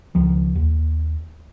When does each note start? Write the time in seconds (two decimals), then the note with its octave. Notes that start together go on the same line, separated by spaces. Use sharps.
0.15 C#2 D#3 F3
0.55 D#2